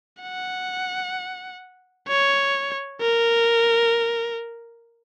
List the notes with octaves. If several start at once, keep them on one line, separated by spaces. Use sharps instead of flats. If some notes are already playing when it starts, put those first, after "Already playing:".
F#5
C#5
A#4